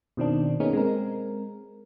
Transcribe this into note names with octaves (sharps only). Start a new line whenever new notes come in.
B2 D#3 C4 D4
A#3 B3 C#4 D#4 G#4 A#4
G#3 C4 A#4